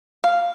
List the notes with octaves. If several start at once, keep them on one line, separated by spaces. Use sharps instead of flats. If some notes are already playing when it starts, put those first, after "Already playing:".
F5